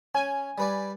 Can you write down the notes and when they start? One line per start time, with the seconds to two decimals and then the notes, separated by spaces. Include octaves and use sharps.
0.15 C#4 G#5
0.58 G3 B4 D5